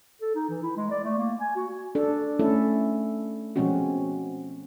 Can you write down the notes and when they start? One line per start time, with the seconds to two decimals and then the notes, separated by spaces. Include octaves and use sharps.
0.22 A4
0.35 D#4
0.50 E3
0.63 E4
0.77 G#3
0.91 D5
1.04 A3
1.18 A#3
1.40 G#5
1.56 F#4
1.95 D4 A4
2.39 A3 C#4 E4 A4
3.56 B2 F3 G#3 C4 C#4 F#4